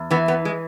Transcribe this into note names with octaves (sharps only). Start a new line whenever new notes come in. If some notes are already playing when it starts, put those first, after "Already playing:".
Already playing: E2
E3 B3
B3
G#3